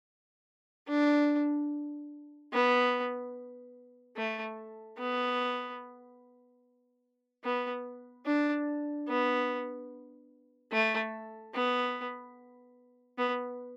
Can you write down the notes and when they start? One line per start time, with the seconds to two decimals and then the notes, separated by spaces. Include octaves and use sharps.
0.89 D4
2.53 B3
4.16 A3
4.98 B3
7.44 B3
8.26 D4
9.08 B3
10.72 A3
11.54 B3
13.18 B3